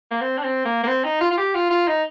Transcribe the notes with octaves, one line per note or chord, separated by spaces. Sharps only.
A#3
C4
D4
C4
A#3
A#3
C4
D#4
F4
F4
G4
F4
F4
D#4